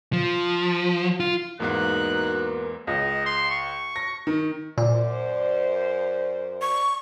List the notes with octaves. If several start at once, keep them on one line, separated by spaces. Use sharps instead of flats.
F3
F4
E2 G#2 A#3 B3 D#4 F#4 F5 F#6
C#2 D#5
C6
C#6
A#6
D#3
F#2 A#2 C5 D5
C#6